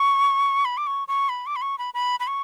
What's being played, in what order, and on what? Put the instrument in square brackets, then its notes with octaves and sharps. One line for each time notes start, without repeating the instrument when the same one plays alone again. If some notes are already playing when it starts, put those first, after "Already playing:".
Already playing: [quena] C#6
B5
D6
C#6
C#6
B5
D6
B5
C#6
B5
B5
B5
C#6